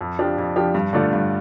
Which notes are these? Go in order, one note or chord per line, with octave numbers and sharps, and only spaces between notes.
F2
F3 D4 G4
F2
F3 D4 G4
G2
D3 A3 F4 D5
G2